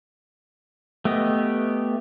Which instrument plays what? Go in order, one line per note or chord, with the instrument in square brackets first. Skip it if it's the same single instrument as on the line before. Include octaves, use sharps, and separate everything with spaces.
[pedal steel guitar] A3 B3 G4 D#5